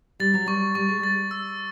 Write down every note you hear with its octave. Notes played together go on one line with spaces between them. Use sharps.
G3 A6
F#3
G3 C#6
G3 C#6
G#3
G3 A6
E6